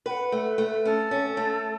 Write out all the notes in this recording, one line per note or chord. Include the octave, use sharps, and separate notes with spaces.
B4 F#5 G5
A3
B4
A3
C#4 A4
C#4
A3